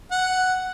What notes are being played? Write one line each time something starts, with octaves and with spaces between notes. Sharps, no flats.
F#5